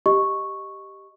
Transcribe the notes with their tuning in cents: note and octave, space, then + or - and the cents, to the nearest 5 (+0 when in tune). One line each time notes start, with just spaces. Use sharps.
G4 +0 D#5 -5 C#6 -5